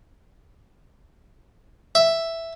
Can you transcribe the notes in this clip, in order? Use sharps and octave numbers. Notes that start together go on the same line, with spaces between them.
E5